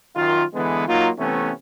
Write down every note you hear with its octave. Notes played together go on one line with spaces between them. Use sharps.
F#2 D#3 F4
D3 E3 G#3 B3
F#3 A#3 D#4 F4
C3 E3 A3 B3 C#4